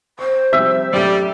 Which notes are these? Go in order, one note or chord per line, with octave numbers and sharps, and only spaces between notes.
C5 C#6
C3 F3 G3 E5
F#2 A2 G3